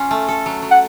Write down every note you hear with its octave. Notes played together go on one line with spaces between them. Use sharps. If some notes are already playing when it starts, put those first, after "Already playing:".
Already playing: C#4 F4
A3
A4
F#3
F#3
F#5